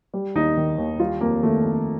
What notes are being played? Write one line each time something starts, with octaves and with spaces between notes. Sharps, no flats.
G3
D#2 D#4
D#3
D#2
G3 F4
F2 A#3
D#3 A3
F2